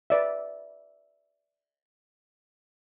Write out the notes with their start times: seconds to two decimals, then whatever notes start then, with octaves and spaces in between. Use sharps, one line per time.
0.10 B4 D5 E5